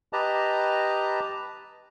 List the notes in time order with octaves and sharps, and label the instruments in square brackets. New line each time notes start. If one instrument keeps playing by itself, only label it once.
[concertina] G4 B4 D#5 A5 A#5